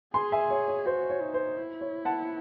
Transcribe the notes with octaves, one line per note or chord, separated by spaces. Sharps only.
G#4 G#5 C6
E5 G#5
C#5
C#5
F#4 C5
C#5
D#4
C5
E4
C#5
F#5 A5